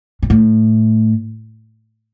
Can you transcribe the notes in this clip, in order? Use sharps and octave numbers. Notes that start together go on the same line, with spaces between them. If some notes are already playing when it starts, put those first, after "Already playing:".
B2
A2